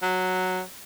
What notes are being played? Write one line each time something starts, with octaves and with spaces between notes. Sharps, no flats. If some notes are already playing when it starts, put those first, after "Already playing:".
F#3